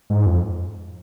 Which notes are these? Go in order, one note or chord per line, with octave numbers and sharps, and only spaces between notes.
G#2
F2